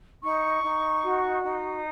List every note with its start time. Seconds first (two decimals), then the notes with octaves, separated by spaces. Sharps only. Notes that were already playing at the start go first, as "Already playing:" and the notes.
0.23 D#4 C#6
0.63 D#4
1.03 F#4
1.43 D#4